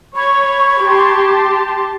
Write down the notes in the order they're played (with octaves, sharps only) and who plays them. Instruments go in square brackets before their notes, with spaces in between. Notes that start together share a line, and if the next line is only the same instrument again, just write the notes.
[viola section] C#5 [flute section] B5 C#6 G#6
[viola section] G4 A5 C6